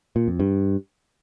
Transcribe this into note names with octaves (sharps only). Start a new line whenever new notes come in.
A#2
F2
G2